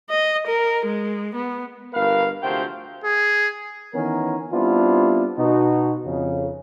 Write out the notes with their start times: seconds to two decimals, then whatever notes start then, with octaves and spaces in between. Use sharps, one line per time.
0.10 D#5
0.47 A#4
0.86 G#3
1.35 B3
1.94 G1 A#4 B4 F5
2.43 D2 C3 F3 F#3 C5 G5
3.04 G#4
3.94 D#3 E3 B3 C#4 A#4
4.53 G3 B3 C4 D4 E4 F4
5.38 B2 D#4 F#4
6.06 F2 C#3